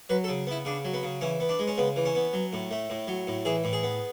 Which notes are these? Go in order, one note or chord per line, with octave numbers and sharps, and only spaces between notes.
F#3 B4
A4
C#3
B3 E4
C#3 D4
F#3
B3
C#3
E3 C#4
B3
D4
G#3
C#4
C#3 B3
E3
C#4
B3
F#3
A2
A3
A2
F#3
A2
E3 G#4
A2
G#4
B3